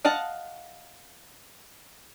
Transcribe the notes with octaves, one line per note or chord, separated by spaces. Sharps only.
D#5 F5 F#5 A5